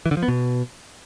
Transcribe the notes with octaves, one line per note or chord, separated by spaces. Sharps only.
E3
D3
F3
B3
B2